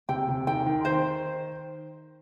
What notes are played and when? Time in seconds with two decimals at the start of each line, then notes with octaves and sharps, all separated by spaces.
0.09 C3 G5
0.28 C3
0.47 D#3 G5
0.66 D#3
0.85 C5